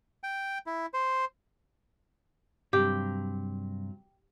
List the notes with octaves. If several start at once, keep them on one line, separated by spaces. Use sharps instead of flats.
G5
E4
C5
G2 C3 F#3 G4